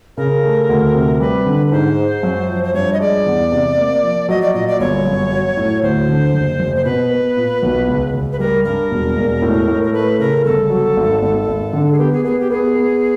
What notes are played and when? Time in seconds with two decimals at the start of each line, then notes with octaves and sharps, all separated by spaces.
0.17 C#3 A#4
0.43 A3
0.69 D2
0.95 C3
1.20 G3 B4
1.46 D3
1.67 B4
1.72 G#2 C5
1.98 G#3
2.23 F#2
2.49 F3
2.64 C5
2.74 G2 C#5
2.93 D#5
3.00 G#3 D5
3.26 E2
3.52 C3
3.78 A#3
4.03 F3
4.29 F#3 D#5
4.42 D5
4.54 A#2 D#5
4.68 D5
4.80 G1 C#5
5.06 F#2
5.31 F#3
5.57 A2
5.83 D2 C5
6.08 D3
6.34 F#1
6.60 F#1
6.76 C5
6.85 B2 B4
7.11 B3
7.37 A#2
7.63 B1
7.88 C#2
8.14 C#2
8.33 B4
8.39 G3 A#4
8.65 G2 A#4
8.91 E1
9.17 E1
9.42 A2
9.68 A2
9.83 A#4
9.93 A3 B4
10.19 C#3 A#4
10.45 G1 A4
10.70 F#3
10.96 G#1
11.22 G#1
11.48 G#1
11.73 D3
11.92 G#4
11.99 B3 G4
12.12 G#4
12.25 B3 G#4
12.40 G4
12.50 B3 G#4
12.76 B3